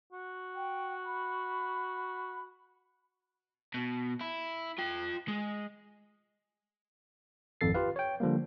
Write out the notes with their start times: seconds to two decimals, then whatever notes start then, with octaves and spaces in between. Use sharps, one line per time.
0.13 F#4
0.55 G5
1.06 B5
3.74 B2
4.21 E4
4.79 F4 G5
5.28 G#3
7.61 G#1 F2 A4 A6 C7
7.74 F4 G4 B4 F5
7.96 C#5 G5
8.20 D3 F3 G3 A#3